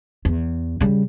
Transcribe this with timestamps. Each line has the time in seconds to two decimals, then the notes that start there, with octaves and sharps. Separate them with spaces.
0.25 E2
0.80 C#3 G3